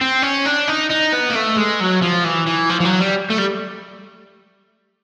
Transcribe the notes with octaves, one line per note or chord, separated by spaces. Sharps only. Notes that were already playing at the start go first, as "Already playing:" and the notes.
C4
C#4
D4
D#4
D#4
B3
A#3
A3
G#3
F#3
F3
E3
E3
F3
F3
F#3
G3
A3
G3